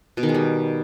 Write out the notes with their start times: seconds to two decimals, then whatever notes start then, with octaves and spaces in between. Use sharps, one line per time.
0.17 B2
0.23 D#3
0.29 G#3
0.35 G3